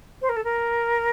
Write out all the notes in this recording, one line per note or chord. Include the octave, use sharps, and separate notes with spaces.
C5
A#4
A4
A#4